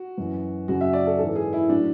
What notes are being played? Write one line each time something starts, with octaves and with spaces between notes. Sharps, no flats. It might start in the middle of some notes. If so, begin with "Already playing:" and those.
Already playing: F#4
F#2 E3
F#2 C#3 F#3 F#4
E5
D5
A4
G#2 E3 A4
G#4
E4
A2 F#3 D4